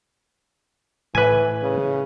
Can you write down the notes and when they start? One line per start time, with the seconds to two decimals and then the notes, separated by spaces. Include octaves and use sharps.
1.15 A2 E3 B4 G#5
1.63 C#3